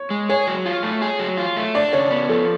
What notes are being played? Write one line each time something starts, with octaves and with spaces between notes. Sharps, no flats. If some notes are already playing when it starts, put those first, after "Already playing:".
Already playing: C#5
G#3
G#4 C#5
F#3
F4
A3
G#4
F#3
F4
A3
D4 D5
C#3 C#5
B3
F3 A4